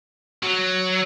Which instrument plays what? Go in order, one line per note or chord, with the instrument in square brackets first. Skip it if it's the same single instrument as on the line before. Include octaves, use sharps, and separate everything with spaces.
[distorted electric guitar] F#3